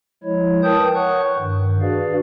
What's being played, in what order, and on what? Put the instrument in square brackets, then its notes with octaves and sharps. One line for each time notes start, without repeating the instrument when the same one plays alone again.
[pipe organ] F3 G#3 E4 C#5
A#4 B4 G5 A5 D#6 G6
C#5 F#5 C#6 F#6
G2 D#3
D4 F#4 G#4 B4 D5 F5